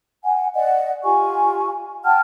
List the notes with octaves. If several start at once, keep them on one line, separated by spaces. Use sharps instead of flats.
F#5 G#5
D5 D#5 F#5
F4 G4 G#5 C#6
F#5 G5 A5 F6